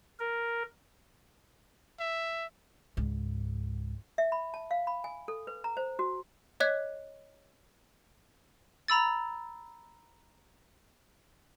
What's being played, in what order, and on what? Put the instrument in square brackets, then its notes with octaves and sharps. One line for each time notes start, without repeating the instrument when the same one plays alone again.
[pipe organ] A#4
[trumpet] E5
[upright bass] C#2 G#2
[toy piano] E5
B5
A5
F5
B5
G#5
A4
B4
A#5
C5
F#4
[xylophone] C#5 D#5 D6 F#6 G#6 B6
A#5 B5 E6 A6